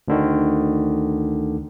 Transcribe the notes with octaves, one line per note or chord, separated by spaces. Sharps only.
D2 D3 D#3